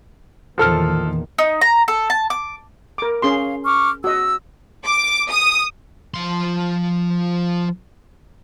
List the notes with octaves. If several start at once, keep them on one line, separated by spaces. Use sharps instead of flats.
E2 A#2 D#3 F3 A4 F6
D#4
A#5
A4
A5
D6
A#4 D6
C#4 G#4 F5 C6
C#6 D6 F6
F#4 D#5 E6
D6
D#6
F3 C6